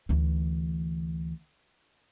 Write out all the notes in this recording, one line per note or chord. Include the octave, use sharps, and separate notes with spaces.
D2 E3